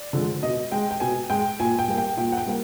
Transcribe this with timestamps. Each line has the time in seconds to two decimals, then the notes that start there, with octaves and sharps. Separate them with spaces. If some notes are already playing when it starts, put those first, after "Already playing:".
Already playing: D5
0.13 D3 F3 G#3
0.42 B2 D#5
0.72 G#3 G5
0.91 G5
1.00 B2 G#5
1.30 G#3 G5
1.59 A#2 G#5
1.79 G5
1.88 G3 A#3
1.98 G5
2.17 A#2 G5
2.32 F#5
2.37 G5
2.47 G3 A#3